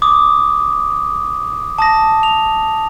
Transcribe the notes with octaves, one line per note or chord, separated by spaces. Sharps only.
D6 D#6
A5 D#6 A#6
F7